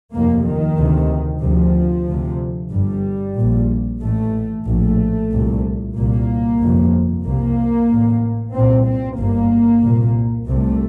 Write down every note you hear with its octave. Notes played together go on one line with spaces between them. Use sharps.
F1 D#2 A#3
D#3
D2 C3
D2 C3 F3
D2 C3
G1 G2 G3
A#1 A#2
A1 A2 A3
A#1 A2 A3
C2 A#2
C2 A#2 A#3
G1 F2 C3
C2 C3 A#3
A1 A2
C2 A#2 C4
C4
G1 G2 A#3
C2 A#2
C2 C3 A3